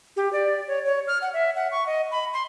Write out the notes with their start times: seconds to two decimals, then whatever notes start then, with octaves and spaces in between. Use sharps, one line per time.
0.17 G4
0.33 D5
0.68 C#5
0.85 C#5
1.08 F6
1.22 F#5
1.34 E5
1.56 F#5
1.72 C#6
1.86 D#5
2.11 B5
2.34 C6